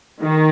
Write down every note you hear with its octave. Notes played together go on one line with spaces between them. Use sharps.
D#3